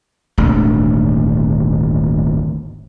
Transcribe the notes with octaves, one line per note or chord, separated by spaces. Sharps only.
D#1 G#1 D2